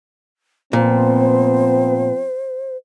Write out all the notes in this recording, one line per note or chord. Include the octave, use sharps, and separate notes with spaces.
A#2 F3 B3 C4 C5